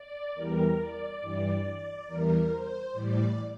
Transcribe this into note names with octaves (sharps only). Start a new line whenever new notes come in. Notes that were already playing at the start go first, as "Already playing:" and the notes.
Already playing: D5
E2 E3 G3 A#4
D5
G2 E3 G3
E2 E3 G3 A#4
C5
A2 E3 G3 D5